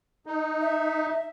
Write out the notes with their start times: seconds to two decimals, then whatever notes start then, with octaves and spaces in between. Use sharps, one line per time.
0.26 D#4
0.61 E5